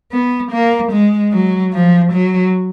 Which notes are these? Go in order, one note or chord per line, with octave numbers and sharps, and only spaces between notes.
B3
A#3
G#3
F#3
F3
F#3